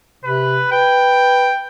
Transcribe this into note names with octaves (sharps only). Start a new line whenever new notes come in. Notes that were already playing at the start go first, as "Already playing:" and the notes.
C3 B4
B4 G5